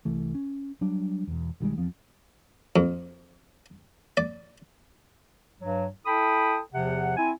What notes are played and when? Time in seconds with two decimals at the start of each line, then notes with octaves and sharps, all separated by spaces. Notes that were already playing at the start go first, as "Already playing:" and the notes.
0.05 C2 E3 A3
0.35 C#4
0.81 F#3 G3 D4
1.27 E1 E2
1.60 B1 D#3 G3 G#3
1.77 E2 F3 C4
2.76 F2
4.17 D5
5.60 G2 F#3
6.06 E4 A4 G5 B5 D#6
6.73 E2 C3 F3 F#5
7.17 C4 E4 G#5